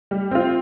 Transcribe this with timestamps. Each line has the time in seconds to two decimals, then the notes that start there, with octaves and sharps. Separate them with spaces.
0.11 G3
0.31 C4 F4